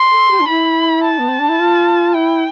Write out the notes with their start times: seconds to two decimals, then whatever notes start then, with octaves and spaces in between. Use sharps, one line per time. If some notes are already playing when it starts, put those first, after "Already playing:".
Already playing: C6
0.11 A4
0.30 G4
0.40 D4
0.48 E4 B5
1.04 A5
1.18 B3
1.28 C4
1.39 D4
1.48 E4
1.59 F4
2.14 E4 G5